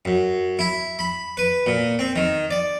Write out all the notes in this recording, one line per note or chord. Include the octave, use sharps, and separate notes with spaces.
F#2
E4
B5
B4
A#2
C4
D#3
D5